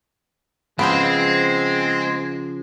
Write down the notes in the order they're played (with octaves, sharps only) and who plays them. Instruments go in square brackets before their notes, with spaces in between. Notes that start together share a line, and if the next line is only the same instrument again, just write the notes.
[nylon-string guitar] C#3 F3 [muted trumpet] G#3 [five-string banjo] B3 F4 C5 [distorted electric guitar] C4